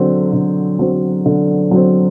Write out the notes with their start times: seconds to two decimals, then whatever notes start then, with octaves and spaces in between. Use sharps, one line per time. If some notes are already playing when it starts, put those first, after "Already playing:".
Already playing: D3 F#3 C4
0.33 D3
0.79 F#3 C4
1.26 D3
1.71 F#3 C4